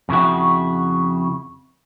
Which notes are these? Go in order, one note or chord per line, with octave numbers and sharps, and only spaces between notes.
F2 C#3 E4 F#4